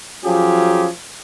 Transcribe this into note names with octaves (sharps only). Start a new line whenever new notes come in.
F3 F#3 C#4 F4 G4 G#4